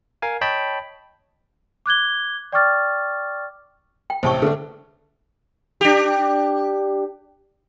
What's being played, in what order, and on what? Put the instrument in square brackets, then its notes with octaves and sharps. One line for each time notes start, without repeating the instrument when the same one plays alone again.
[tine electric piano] A#4 F5 G#5
C#5 D#5 G5 A5 B5
[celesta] D6 F#6 G#6 G7
D5 G5 C#6 D6 F6 A6
[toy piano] G5
[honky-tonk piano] A1 C3 G5 [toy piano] C5 A5 C#6
[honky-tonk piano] D3 A3 D4 [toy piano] A4 B4 E5
[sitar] D4 G4